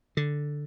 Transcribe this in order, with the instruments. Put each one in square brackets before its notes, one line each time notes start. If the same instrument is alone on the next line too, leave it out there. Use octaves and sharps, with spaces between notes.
[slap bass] D3